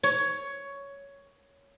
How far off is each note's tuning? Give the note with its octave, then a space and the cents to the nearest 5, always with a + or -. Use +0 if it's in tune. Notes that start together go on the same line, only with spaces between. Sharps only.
C#5 +10